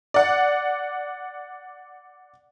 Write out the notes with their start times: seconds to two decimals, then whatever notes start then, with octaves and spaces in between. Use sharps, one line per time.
0.14 D5 F#5